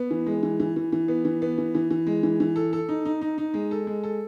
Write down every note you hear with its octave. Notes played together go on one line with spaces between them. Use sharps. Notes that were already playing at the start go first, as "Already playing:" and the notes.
Already playing: B3
E3
G#3
E3
E3
E3
E3
B3
E3
B3
E3
E3
E3
G#3
E3
E3
A4
A4
D#4
D#4
D#4
D#4
G#3
A4
G#3
A4